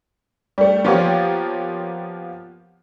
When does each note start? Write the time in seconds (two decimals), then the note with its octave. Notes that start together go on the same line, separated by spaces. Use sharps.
0.58 G3 A3
0.84 F3 A#3 B3 F4 G4 C#5